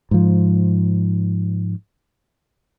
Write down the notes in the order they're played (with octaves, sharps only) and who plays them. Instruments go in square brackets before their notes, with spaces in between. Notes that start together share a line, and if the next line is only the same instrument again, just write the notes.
[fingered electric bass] G#2 F3